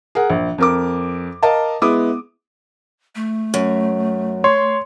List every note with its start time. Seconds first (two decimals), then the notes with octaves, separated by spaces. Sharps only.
0.15 G#4 A#4 F#5
0.30 A#1
0.58 F2 A#4 D6
1.43 A#4 D#5 F5 A5
1.81 G#3 B3 E4 D6 D#6
3.15 A3
3.54 F#2
4.44 C#5 C6